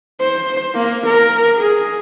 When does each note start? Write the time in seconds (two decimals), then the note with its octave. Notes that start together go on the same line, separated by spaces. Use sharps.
0.20 C5
0.75 A#3
1.07 A#4
1.56 G#4